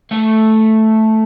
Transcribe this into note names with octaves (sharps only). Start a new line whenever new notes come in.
A3